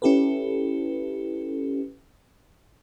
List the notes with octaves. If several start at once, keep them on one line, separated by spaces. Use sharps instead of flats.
C#4 E4 G4 A4 B4